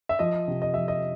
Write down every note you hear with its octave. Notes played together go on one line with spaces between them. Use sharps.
E5
F3 D#5
C3
D#5
F3 E5
D#5